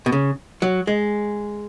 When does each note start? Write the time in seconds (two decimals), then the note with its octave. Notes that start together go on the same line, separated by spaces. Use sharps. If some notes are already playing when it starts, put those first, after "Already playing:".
0.06 B2
0.12 C#3
0.62 F#3
0.87 G#3